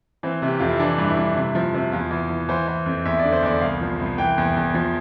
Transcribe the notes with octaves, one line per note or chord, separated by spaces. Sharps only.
E3 C4
C3
G4
F2 F4
E4
E3 D4
G2
E4
G2
C3
F3
C3
E2 F4
E3
E3
E3 C5
E3
F2
E2 E5
D5
D3
C5
E2 D5
C2 F5
F3
C2
E3 G5
E2
E2
F3